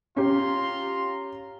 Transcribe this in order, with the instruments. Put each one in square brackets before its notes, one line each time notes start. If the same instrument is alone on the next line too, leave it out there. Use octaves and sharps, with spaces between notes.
[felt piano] C#4 G4 [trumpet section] F4 A#5 C6